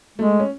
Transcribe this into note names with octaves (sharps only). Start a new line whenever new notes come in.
G#3 A3
C#4